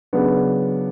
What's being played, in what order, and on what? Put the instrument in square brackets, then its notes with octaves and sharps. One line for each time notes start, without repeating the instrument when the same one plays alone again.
[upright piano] C#3 F#3 B3 D4